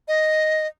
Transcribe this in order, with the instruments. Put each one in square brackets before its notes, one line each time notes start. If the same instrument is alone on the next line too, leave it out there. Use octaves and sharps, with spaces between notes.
[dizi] D#5